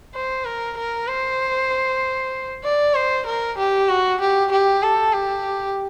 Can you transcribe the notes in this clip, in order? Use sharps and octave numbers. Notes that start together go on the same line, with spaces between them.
C5
A#4
A#4
C5
D5
C5
A#4
G4
F#4
G4
G4
A4
G4